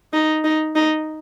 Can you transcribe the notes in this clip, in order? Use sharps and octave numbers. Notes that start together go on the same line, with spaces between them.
D#4
D#4
D#4